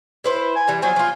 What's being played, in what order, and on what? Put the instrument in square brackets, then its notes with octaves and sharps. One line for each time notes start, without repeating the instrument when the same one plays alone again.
[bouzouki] E4 B4 C5
[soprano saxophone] G#5
[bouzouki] E3 G3
[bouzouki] F3 F#3 [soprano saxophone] G#5
[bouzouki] F3 F4